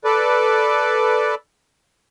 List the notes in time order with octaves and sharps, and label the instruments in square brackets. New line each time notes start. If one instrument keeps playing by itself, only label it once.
[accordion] A4 B4 D5